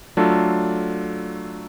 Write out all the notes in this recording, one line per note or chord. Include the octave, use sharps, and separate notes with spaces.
F#3 A3 D4 F4 A4